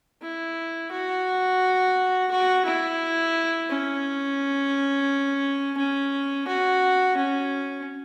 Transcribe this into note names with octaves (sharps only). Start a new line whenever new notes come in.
E4
F#4
F#4
E4
C#4
C#4
F#4
C#4